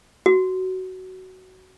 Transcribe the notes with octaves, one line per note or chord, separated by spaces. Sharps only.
F#4